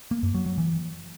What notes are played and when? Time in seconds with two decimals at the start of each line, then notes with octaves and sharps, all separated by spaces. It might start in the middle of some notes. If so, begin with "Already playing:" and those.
0.11 A#3
0.23 F#2
0.34 F#3
0.46 F#3
0.58 E3